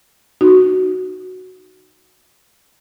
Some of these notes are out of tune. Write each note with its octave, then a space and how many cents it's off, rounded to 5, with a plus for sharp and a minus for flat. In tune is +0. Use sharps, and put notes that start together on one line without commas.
D#4 -25 F#4 +0